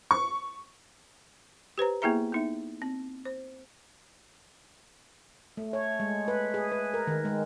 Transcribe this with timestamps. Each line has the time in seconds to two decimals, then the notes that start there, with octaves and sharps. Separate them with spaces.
0.11 C#6
1.78 G4 B4 C5 A#5
2.02 A#3 B3 E4 G#4 E5 A#5
2.32 B3 D#4 E5
2.82 C4
3.25 C5
5.57 A3
5.73 C#5
6.00 G#3
6.28 B4
6.54 G#4
6.72 B4
6.94 A#4
7.07 D#3
7.25 G#3